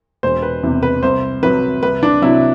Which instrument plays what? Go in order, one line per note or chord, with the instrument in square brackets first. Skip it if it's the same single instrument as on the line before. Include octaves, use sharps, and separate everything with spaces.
[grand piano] E1 C5
B4
E2 C3
B4
C2 C5
C3 F#3 B4
C2 B4
D4
C3 F#3 E4